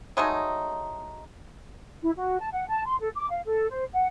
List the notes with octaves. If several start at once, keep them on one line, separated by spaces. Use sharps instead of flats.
F#3 G#3 A3 D#4
E4
F#4
A5
F#5
A5
C6
A4
D6
F5
A4
C5
F#5